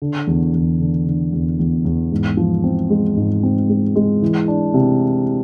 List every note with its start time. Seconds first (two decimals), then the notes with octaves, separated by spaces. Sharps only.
0.02 D3
0.27 E2
0.54 E2
0.80 D3
1.07 D3
1.33 E2
1.59 E2
1.85 E2
2.12 G#2
2.37 F3
2.64 C4
2.90 G#3
3.16 G#2
3.43 C4
3.69 G#3
3.96 G#3
4.22 E3
4.48 D4
4.74 C3